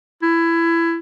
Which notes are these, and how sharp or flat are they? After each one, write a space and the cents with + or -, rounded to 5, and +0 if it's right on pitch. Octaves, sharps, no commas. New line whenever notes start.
E4 +20